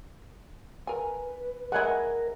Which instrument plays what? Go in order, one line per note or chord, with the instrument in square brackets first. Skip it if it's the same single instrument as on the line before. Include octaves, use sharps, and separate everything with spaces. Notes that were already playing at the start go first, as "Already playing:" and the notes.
[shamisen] A#4 G#5 [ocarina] B4
[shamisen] G#3 E4 [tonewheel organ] A#4 [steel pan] F#5 G#5